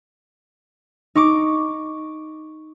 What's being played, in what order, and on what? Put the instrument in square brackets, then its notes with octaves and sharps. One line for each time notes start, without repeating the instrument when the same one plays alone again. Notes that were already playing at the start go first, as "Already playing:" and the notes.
[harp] D#4 C#6 D6